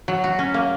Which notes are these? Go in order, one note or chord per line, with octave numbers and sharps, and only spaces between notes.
F#3
F#4
C#4
A#3